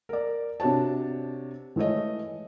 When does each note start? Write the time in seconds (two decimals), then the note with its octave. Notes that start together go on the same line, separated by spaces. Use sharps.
0.09 A#4 D5
0.60 C3 D4 F#4 C#5 A5
1.76 E3 G#3 A3 C#5 D#5